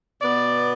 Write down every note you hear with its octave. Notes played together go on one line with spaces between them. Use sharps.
B2 B3 D5